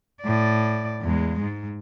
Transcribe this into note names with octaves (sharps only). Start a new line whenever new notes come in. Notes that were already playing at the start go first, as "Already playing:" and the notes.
A2 D5
E2 G#3
G#2